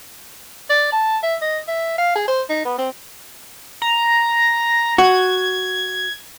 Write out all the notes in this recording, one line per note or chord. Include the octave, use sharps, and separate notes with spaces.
D5
A5
E5
D#5
E5
F5
G#4
C5
D#4
B3
C4
A#5
F#4 G#6